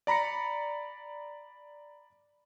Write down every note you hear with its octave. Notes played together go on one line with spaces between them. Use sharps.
D5 A#5 B5 A#6 C#7